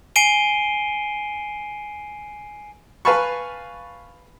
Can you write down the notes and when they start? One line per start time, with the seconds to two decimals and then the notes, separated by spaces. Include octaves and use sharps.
0.16 G#5 C7 D7 D#7 G7
3.05 B4 F5 G#5 A5 B5 C#6